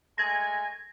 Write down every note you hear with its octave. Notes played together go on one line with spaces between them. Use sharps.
G#3 A3 G#5 G#6 A#6